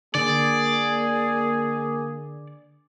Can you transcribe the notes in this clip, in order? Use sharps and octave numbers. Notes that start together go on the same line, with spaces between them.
D3 A#3 G#4 D5